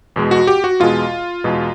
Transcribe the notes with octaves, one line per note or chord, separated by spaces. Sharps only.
E2 B2 G#3
F#4
G4
F#4
E2 B2 G#3 F4
E2 B2 G#3